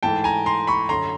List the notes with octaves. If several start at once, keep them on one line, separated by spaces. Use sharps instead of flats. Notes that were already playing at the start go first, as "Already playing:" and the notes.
G#2 E3 A3 G5 A5
G#5 A#5
A#5 C6
B5 C#6
F#2 D3 A#5 C6